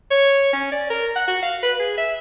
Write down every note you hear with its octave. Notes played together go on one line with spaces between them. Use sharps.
C#5
C#4
D5
A#4
F#5
F#4
F5
B4
G#4
E5